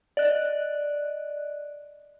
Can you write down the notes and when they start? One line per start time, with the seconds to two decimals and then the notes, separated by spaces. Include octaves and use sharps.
0.17 D5 D#5 F#6